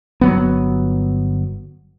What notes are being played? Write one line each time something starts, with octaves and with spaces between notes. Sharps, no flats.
G1 F#3 B3